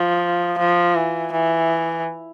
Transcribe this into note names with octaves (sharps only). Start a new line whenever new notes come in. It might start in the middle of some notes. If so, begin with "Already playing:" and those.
Already playing: F3
F3
E3
E3